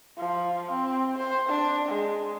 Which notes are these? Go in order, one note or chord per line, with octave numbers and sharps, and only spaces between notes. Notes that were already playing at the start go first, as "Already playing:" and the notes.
F3
C4
C5
D4
G#3